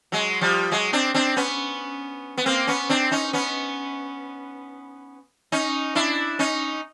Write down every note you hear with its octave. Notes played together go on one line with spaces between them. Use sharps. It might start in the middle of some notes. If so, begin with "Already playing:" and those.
F#3 G#3
F3 G3
F#3 G#3
C4 D4
C4 D4
B3 C#4
B3
A#3 C4
B3 C#4
C4 D4
C#4 D#4
B3 C#4
C#4 D#4
D4 E4
C#4 D#4